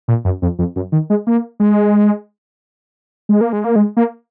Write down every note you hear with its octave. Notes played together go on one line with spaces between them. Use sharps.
A#2
F#2
F2
F2
F#2
D#3
G#3
A#3
G#3
G#3
A#3
G#3
A#3
G#3
A#3